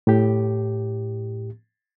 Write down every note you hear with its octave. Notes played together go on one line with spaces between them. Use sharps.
A2 G4